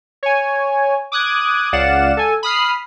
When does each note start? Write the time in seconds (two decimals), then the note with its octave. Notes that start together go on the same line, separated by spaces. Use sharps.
0.23 C#5 G#5
1.12 D6 D#6 F#6 G#6
1.73 C#2 D5 F5 F#5 E7
2.17 A4 G#5
2.43 B5 D#6 F6 C7